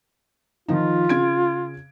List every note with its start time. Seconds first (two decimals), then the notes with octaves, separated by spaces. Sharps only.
0.68 D#3 F3 D#4 F4
1.09 C#3 G#6 D7